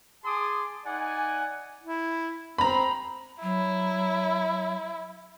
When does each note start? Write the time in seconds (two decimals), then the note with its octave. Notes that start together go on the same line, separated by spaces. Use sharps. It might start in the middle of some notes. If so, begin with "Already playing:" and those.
0.25 G#4 A5 C6 D6 D#6
0.86 D#4 D5 F#5 G#5
1.84 E4
2.58 C4 A#5 B5
3.42 F#3 E4